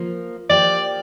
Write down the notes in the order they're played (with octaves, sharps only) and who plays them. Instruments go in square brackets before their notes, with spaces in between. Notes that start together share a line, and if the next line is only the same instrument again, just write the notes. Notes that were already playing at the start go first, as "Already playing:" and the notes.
Already playing: [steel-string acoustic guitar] F3 A#3 F4
[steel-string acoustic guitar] F3 A#3 G4 [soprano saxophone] D5